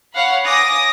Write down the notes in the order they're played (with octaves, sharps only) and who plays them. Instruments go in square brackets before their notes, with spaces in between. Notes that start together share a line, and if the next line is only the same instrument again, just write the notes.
[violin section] C#5 F5 F#5 B5
G#5 D6 D#6 A#6